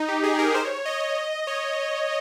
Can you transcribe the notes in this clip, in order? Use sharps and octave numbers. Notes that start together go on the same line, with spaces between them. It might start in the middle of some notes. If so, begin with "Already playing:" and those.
Already playing: D#4
G4
G#4
A#4
C5
C#5
D#5
C#5